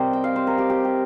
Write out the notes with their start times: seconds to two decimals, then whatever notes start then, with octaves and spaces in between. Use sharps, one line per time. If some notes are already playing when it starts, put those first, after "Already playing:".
Already playing: C3 G3 C4 G4 A#4 C5 D#5
0.13 G5
0.24 F5
0.36 C5
0.47 A#4
0.58 G4
0.70 G4
0.85 G4